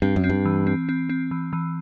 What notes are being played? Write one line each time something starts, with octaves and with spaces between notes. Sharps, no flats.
G2 C4
F#2
C4
G2
E3
C4
C4
C4
E3
E3